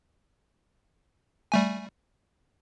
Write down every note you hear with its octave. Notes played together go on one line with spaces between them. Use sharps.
G3 A3 G#5